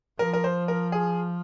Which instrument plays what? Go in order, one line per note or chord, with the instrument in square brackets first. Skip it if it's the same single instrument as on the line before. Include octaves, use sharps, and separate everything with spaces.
[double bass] F3 [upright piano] A#4
[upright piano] A#4
C5
A#4
G#4